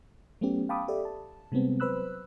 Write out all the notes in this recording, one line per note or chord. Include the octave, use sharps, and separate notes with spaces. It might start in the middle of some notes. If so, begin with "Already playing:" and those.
F#3 A3 B3 C#4 G4
F5 G5 A5 B5 D6 D#6
G4 A4 D5 E5
A5
C3 G3 G#3 B3 C4
F#3 B4 C5 B5 E6 F#6